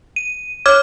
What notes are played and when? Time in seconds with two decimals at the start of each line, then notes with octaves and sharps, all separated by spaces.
0.16 D#7
0.66 C#5 D6 F6 G#6